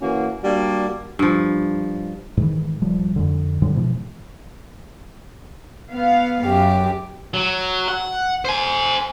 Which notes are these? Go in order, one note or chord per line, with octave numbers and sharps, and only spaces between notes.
E3 A#3 C#4 F#4
G3 A#3 D4 F#4
G2 F3
G#2 D#3 E3
D#1 F3 G3 A3
F2 D3
G2 D3 F#3 G3
G#2 B2 E3 F3
B3 F5
F#2 G4
F#3
F#5
C5 G#5